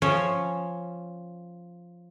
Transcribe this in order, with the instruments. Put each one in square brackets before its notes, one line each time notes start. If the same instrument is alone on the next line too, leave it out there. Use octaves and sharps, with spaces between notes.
[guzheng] F3 C#4 C#5 C6